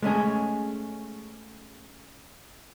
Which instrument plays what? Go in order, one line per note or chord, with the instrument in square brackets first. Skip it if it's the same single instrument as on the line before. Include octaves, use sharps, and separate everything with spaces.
[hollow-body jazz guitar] G#3 A3 C#4 G#4